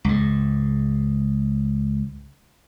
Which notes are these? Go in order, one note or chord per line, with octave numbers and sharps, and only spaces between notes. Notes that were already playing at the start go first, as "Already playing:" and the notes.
C#2 G#2